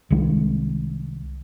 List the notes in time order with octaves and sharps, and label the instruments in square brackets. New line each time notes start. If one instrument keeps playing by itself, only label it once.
[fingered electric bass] C2 D#3 G#3